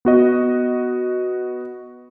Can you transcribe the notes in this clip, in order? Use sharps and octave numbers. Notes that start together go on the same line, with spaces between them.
B3 F#4 D#5